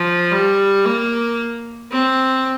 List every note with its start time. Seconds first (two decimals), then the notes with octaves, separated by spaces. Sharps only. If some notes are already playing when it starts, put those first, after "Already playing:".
Already playing: F3
0.31 G3
0.86 A#3
1.92 C4